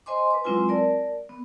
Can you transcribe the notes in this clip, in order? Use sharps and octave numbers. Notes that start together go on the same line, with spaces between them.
C5 D#5 G#5 C6 D6
B4 D6
F#3 G#3 C4 E4 F4 G#5
A#4 D5 A5
B3